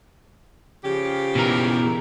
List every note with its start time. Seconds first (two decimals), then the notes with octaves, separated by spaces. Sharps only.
0.84 C#3 F3 G4
1.35 B2 E3 A#4